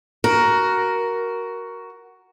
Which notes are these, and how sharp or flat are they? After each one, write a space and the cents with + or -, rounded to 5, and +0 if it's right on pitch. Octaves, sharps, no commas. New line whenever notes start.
F#4 +10 A#4 +5